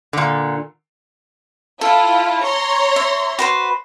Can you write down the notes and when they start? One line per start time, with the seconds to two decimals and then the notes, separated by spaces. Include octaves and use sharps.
0.13 A#2 D3
1.81 E4 F4 A4
2.43 C#5 A#5 C6
2.96 E5
3.39 F#4 B4 C5